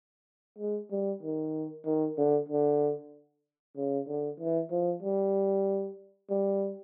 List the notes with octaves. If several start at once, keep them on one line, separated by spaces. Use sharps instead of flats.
G#3
G3
D#3
D#3
D3
D3
C#3
D3
E3
F3
G3
G3